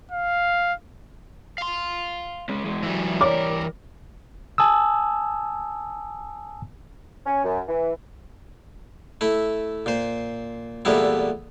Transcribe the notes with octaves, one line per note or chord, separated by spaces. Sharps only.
F5
F5 C6
G#3 C#4
E3 G#3
G#2 E3 F#3 G3
A#4 C#5 D5 D6
G#5 A5 D#6 E6
C#4
F#2
E3
A3 E4
A#2 C5
E2 A#2 G3 A3 B3 E4